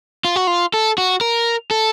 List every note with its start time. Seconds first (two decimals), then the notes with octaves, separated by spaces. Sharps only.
0.25 F4
0.36 F#4
0.47 F4
0.74 A4
0.98 F#4
1.21 A#4
1.71 A4